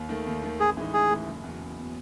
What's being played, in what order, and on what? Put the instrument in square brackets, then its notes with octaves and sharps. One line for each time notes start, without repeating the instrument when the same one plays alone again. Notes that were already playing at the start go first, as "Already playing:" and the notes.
Already playing: [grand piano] D#2
D#3 A3
D#2
D#3 A3
[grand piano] A1 [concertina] G#4
[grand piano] A2 E3 G#3 D#4
[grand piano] A1 [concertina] G#4
[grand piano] A2 E3 G#3 D#4
F#1
E2 B2
F#1
B2